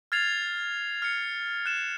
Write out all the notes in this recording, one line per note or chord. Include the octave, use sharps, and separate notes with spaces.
F6 G#6 A6 C7 F7
F6 C7 C#7
F#6 E7